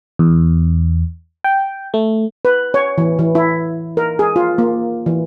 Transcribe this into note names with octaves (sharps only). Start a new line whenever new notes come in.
E2
G5
A3
B4
C#5
E3
E3
E4
A#4
G#4
F4
A#3
E3